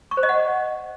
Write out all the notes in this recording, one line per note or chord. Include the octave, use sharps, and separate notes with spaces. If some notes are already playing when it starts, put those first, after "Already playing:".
C#6
C5
D#5
F#5